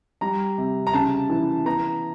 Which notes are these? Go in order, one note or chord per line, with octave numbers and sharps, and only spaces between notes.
G3 A#5
C3
A#5
C#3 A5
E3
B3 A#5